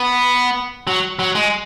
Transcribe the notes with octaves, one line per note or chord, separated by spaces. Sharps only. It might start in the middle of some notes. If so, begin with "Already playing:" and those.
Already playing: B3
F#3
F#3
G#3